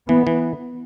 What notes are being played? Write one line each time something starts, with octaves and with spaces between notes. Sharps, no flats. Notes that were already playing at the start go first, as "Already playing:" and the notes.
E3 B3
E3